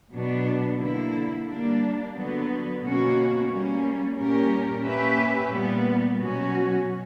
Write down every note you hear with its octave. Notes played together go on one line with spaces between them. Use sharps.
B2 F#3 B3 D4
D3 A#3 E4
G3 A#3 D4
D3 F#3 B3
B2 A#3 C#4 F#4
G3 A#3 C#4
A#2 G3 C#4 G4 A#4
A#3 C#4 G4 B4 E5
A#2 G3 B3
B2 F#3 C#4 F#4